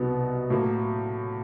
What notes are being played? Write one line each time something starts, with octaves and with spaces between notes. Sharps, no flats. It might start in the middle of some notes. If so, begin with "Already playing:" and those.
Already playing: C2 B2 F#3 B3 D#4
A2 F#3 A#3